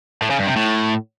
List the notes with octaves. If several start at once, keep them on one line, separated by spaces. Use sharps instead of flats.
A2
C#3
G2
C3
A2